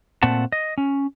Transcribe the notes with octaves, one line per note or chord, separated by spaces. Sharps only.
A#2 A3 C4 F#5 A5
D#5
C#4